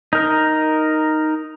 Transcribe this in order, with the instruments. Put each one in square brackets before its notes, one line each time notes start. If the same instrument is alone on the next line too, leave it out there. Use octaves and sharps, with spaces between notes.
[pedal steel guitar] D#4 A#4